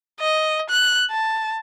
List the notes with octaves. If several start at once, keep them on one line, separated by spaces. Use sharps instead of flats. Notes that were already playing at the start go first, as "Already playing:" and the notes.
D#5
F#6
A5